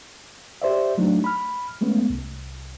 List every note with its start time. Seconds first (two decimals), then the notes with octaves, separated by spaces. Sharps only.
0.62 G4 C5 D5 E5
0.98 F#3 A3 D4 D#4
1.24 B5 F6
1.81 G#3 A3 B3 C#4
2.10 C2